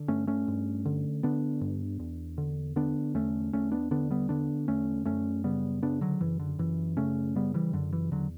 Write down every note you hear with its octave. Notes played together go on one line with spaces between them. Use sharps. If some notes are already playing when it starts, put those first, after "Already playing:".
Already playing: D3
G2 A3 C#4
A3 C#4
G2
D3
D3 B3 D4
G2
E2
D3
D3 B3 D4
E2 A3 C#4
E2 A3 C#4
B3 D4
D3 B3 D4
G3 B3
D3 B3 D4
E2 A3 C#4
F#2 A3 C#4
C#3 G3 B3
C#3 B3 D4
D3 F#3
F#2 E3
D3
F#2 E3
C#3 A3 C#4
C#3 G3 B3
E3 G3
F#2 D3
E3
E2 D3 F#3